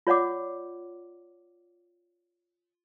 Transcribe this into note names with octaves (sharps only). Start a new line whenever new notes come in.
F4 C#5 D5 F#5 D6